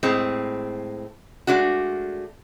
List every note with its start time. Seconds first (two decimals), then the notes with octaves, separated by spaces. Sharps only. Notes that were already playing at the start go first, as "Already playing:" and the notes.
0.03 A2 G#3 C4
1.47 G#3 A3 D4 F#4